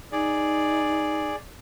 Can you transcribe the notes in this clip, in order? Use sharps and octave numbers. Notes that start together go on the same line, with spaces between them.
D#4 G#4 D5